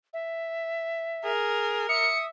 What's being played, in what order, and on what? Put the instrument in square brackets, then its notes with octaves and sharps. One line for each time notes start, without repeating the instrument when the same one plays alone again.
[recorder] E5
[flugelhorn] G#4 [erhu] A#4
[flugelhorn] E5 [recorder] D#6 [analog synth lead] C#7